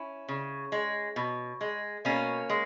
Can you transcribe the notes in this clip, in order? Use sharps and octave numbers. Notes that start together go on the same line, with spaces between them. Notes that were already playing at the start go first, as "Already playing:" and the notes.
Already playing: C#4 E4
C#3
G#3
B2
G#3
B2 A#3 C#4
G#3